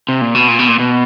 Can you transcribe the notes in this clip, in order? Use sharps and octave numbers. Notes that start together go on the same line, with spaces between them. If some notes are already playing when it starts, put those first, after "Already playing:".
C3
A#2
B2
A#2
B2
A#2
B2